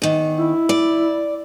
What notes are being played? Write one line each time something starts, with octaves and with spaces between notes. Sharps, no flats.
E2 D#3
E4
D5